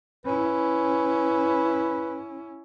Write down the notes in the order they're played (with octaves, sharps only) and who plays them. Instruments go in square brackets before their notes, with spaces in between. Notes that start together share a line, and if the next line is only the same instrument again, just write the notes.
[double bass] C#4 E4 [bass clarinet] B4